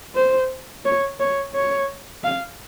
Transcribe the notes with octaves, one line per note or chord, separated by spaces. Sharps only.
C5
C#5
C#5
C#5
F5